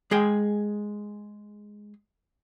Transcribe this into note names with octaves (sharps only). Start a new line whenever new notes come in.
G#3 G#4 G5